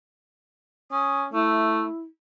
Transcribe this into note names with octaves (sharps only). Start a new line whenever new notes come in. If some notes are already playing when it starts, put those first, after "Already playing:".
C#4 D#6
A3 E4